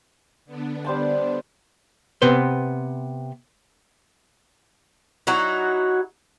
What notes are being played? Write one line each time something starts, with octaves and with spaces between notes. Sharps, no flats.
D3 B3 D4
G3 C5 A5
C3 B3 B4 C5
F#3 D#4 E4 F#4